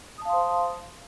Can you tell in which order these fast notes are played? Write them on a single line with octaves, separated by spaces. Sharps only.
D#6 A5 F5 C6 C5